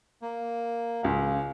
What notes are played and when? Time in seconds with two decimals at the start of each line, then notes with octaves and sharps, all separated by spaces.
0.22 A#3
1.03 C#2 F5